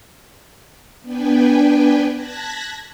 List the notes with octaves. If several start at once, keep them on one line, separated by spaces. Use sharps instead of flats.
B3 D4 B4 G5 G#5
A5 F#6 G#6 A#6 B6